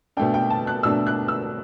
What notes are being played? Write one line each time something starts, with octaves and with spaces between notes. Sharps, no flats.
B2 A3 D4 G5
G5
A5
F#6
B2 A3 D4 E6
F#6
E6